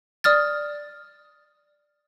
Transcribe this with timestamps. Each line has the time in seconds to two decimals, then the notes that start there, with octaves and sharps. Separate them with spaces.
0.24 D5 D#6 F6 A6